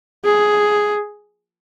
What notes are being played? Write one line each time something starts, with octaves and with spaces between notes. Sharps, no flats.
G#4